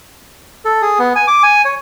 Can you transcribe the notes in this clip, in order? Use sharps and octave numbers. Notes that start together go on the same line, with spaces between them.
A4
G#4
B3
G#5
D6
G#5
C#5